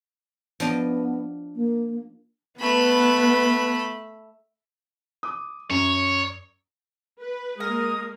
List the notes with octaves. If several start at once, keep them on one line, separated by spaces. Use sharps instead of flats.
F3 B3 D4 D#5
A#3
A3 B3 B4 B5
D6 D#6
F#2 C#5
B4
G#3 A#3 A#4 D#6